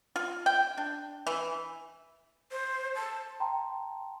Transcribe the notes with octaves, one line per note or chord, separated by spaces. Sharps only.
F4
G5
D4
E3
C5
A5
G5 A5 A#5 C6